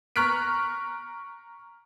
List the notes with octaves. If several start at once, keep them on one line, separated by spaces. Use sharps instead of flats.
A#5 C#6 F6 F#6 B6 D7